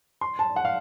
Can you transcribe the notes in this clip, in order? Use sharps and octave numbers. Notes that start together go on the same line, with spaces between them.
C6
A5
F#5
F5